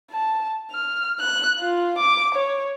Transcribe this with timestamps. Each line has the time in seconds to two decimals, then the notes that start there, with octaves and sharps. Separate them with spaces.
0.11 A5
0.71 F6
1.20 F#6
1.59 F4
1.99 D6
2.35 C#5